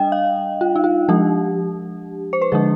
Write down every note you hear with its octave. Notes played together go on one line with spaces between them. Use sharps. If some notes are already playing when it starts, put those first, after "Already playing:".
Already playing: G3 D4 D#5 G5
F5
F4
D#4
F4
F3 G#3 D4 G4
C5
B4
D3 F3 G#3 D4 G#4